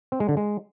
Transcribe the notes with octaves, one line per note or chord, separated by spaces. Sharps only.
C4
G#3
D3
G#3